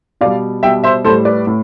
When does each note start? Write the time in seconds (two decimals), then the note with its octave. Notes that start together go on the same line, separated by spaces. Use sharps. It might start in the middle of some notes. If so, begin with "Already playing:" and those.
0.21 B2 G3 D5 F5
0.63 B2 G3 E5 G5
0.84 C5 E5
1.05 A2 A4 C5
1.09 G3
1.25 B4 D5
1.47 A2